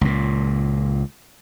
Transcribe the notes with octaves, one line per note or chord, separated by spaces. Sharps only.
C#2 A#2